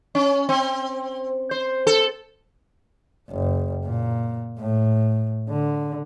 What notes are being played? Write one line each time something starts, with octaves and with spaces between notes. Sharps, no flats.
C#4
C4
C5
A4
F#1
A#2
A2
D3